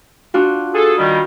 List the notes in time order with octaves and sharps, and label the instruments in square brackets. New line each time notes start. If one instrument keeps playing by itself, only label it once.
[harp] D4 F4 F#4
[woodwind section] G#4 A4
D#3 G3